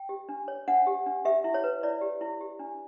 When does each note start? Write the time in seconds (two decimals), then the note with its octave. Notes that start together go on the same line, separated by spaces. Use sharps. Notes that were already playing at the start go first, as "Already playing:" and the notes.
Already playing: G5
0.09 G4
0.29 D4
0.48 C#5
0.68 D4 F#5
0.87 G4
1.06 D4
1.25 G4 E5
1.44 E4
1.54 C#5
1.64 B4
1.83 E4 D5
2.01 G4
2.21 E4
2.41 G4
2.59 D4